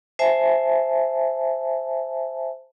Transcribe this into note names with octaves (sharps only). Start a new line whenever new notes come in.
C5 E5 G#5 A5